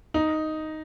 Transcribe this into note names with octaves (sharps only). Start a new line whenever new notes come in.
D#4